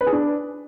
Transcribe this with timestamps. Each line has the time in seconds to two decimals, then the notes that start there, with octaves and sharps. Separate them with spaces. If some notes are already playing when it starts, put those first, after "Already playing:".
0.01 B4
0.07 G#4
0.12 D4